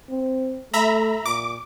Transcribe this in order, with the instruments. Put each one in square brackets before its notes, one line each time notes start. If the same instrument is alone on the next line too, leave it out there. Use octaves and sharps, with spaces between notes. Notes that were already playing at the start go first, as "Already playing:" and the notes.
[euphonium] C4
[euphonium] A3 [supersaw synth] E5 A#5 B5
[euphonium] A#2 [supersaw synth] D6